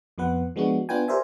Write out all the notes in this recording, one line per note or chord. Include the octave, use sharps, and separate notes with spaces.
F2 F3 B3 B4 F#5
F3 G#3 B3 D4 F#4
B3 D4 F4 B4 G5 G#5
G4 A#4 C5 D5 E5 G#5